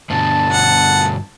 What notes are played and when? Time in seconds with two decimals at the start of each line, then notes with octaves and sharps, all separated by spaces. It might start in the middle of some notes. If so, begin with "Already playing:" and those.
0.10 G2 B2 D3 A5
0.52 F#5